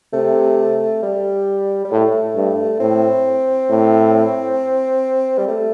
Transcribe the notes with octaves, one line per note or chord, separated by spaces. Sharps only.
C3 A3
G3
G3
A2 A3
G2
A2 C4
A2
G3
A3